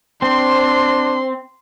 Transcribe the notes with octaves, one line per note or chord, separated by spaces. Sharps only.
C4 D4 C6